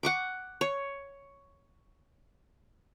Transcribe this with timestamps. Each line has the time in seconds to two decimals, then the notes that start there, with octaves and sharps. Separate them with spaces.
0.03 F#5 C#6 D6
0.61 C#5